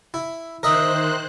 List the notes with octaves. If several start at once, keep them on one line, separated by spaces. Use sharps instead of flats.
E4
D#3 A#4 C5 D#5 E5 F#6